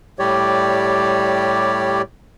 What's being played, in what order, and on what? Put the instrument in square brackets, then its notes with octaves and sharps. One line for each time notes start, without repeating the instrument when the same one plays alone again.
[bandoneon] A2 G3 G4 C#5 D5